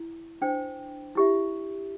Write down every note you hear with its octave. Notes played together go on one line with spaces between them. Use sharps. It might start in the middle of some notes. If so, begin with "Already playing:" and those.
Already playing: E4
D4 C5 G5
E4 G4 E5